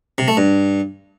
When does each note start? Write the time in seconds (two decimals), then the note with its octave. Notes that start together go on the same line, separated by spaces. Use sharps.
0.18 C3
0.28 A3
0.37 G2